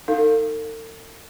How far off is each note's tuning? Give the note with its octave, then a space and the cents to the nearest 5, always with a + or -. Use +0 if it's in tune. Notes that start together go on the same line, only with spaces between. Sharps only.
D#4 +0 A4 +45 F5 +0